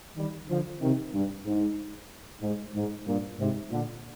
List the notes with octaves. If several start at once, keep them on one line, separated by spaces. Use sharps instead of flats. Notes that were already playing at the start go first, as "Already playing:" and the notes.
D#3 G3
D3 F3
C3 D#3
G2
G#2
G#2
G#2
G2 A#2
G#2 C3
A#2 D3